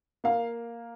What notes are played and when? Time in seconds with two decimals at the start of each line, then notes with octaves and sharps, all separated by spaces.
0.24 A#3 F5